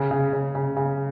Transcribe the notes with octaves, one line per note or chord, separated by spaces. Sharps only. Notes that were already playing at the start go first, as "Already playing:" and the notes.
Already playing: C#3
C#3
C#3
C#3
C#3